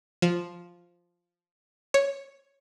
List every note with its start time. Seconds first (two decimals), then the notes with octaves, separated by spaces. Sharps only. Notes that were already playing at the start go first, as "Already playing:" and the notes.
0.22 F3
1.94 C#5